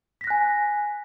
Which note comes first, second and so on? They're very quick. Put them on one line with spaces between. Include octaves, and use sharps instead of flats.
B6 A#6 F#6 G#5